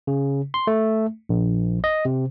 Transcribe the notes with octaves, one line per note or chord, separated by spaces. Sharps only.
C#3
C6
A3
A#1
D#5
C3